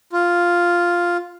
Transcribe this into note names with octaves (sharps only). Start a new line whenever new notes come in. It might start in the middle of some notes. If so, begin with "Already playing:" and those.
F4